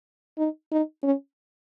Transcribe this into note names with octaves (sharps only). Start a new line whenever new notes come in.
D#4
D#4
C#4